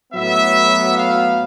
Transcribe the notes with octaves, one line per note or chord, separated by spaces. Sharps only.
A2 F#3 B3 E5
F5